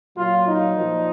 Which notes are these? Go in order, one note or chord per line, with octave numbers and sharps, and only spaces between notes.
A#2 F#3 F4
D#4
A#2 F3